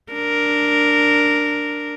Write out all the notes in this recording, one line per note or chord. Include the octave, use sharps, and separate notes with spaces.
D4 A#4